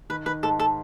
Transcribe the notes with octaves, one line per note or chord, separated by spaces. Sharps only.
D#3 B4
D#3 B4
G#2 A4
A4